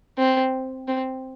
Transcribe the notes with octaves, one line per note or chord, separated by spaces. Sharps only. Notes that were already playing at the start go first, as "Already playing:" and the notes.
C4
C4